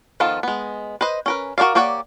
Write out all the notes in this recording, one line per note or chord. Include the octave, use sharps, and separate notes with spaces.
D#3 F3 B3 F4 A4
G#3 B3
B4 C5 D#5
C#4 A#4 B4
F#4 A#4 C#5 D5 F5
A#3 G4 C#5 D5 F#5